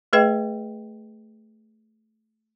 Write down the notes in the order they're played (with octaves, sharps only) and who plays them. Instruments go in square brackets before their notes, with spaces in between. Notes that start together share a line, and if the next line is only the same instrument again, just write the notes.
[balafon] A3 G#4 B4 D#5 G5